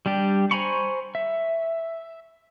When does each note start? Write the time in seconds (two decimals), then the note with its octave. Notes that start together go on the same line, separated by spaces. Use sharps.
0.06 G3 D4 G4
0.51 C5 G#5 A#5 B5 C#6
1.15 E5